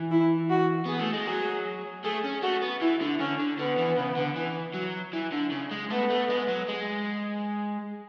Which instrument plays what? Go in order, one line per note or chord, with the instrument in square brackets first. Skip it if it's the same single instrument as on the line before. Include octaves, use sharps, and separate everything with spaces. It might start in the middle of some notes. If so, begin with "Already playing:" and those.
Already playing: [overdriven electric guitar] E3
[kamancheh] E4
F#4
[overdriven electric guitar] B3 [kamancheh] G#4
[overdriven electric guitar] A3
G#3
[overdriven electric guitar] F#3 [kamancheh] G#4
[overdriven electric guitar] A3 [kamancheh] G#4
[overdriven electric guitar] C#4
[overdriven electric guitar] A3 [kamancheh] F#4
[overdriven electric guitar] B3
[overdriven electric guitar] E3 [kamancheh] E4
[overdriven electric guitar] D3
[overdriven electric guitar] D3 [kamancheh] C#4
[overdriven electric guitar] D3
[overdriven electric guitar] D3 [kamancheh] B3
[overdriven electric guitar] E3
C#3
D3
E3
F#3
E3
D3
C#3
G#3
[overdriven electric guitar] A3 [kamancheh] B3
[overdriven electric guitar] A3
G#3
F#3
G#3